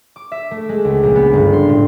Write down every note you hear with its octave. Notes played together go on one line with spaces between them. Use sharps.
D6
E5
A3
G#3
C#2
A#1
B3
G1
C6
A2